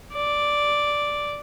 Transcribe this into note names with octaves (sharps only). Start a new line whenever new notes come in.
D5